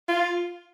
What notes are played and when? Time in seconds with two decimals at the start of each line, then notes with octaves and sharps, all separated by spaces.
0.08 F4